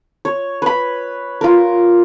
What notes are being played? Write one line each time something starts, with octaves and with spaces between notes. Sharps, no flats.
C#5
B4 B5
F4 A#4